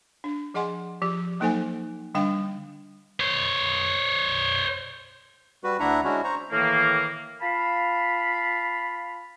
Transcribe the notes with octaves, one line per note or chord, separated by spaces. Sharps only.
D4
F3 G#4 D#5 F#5 G#5 C6
F3 G4
F#3 A#3 D#4 A4 C5 G#5
D3 G3 D4 F5 G5
C5 C#5
G3 F#4 B4
D2 D4 E4 E5 F#5 A#5
G#3 C#4 D4 E4 F#4
C5 A#5 C#6
A2 D#3 E3 A#3
F4 F5 A5 B5